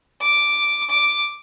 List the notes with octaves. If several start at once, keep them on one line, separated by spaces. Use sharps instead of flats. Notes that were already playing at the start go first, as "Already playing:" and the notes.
D6
D6